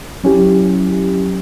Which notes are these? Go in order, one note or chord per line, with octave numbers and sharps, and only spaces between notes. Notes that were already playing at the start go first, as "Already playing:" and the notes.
F#3 C#4 E4 G4